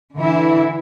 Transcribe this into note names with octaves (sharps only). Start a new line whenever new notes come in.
D3 E3 E4